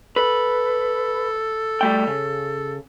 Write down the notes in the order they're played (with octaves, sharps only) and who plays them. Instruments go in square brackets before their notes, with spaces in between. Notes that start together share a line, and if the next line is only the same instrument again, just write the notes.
[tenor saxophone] A4 [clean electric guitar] B4
[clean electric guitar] G3 A3 G5
C#3